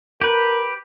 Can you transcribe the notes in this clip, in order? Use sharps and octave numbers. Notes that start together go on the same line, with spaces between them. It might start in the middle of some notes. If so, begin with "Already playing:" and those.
G4 A#4 B4